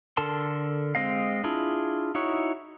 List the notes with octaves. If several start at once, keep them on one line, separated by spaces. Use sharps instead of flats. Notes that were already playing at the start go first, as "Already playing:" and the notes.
D3 A4 A#4 A5 C6
G#3 C4 D#5 F5
D4 E4 F4 G#4
D#4 E4 F#4 C#5